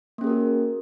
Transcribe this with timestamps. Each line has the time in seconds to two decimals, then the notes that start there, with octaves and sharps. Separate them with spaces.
0.18 A#3
0.21 C#4
0.24 G#4
0.27 A#4
0.30 F#4